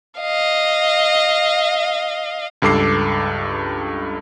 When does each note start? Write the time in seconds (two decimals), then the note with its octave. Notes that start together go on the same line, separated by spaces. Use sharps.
0.20 D#5 F5
2.62 C#2 G2 A4 D6 C7